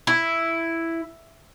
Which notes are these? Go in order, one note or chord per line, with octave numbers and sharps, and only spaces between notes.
E4